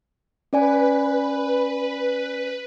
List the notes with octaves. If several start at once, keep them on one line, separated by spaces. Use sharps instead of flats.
C#4 B4 D5 G#5